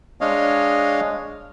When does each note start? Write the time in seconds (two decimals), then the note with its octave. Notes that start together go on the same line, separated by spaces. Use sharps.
0.21 G#3 D4 C#5 D#5 F5